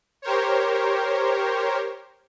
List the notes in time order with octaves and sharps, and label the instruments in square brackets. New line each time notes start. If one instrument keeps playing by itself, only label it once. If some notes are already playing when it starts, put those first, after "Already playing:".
[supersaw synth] G4 A#4 C5 C#5